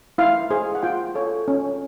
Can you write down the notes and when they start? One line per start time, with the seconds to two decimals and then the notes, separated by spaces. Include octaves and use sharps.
0.18 E4 F5
0.50 G#4 C5
0.75 F#5
0.83 F4 G5
1.15 A4 C#5
1.48 C#4